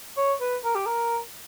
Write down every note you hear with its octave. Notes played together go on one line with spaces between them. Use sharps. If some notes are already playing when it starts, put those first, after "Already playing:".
C#5
B4
A#4
G4
A#4